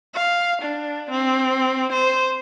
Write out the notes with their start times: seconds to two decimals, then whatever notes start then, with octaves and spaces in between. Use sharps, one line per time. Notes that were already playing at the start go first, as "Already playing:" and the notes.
0.14 F5
0.62 D4
1.10 C4
1.92 C5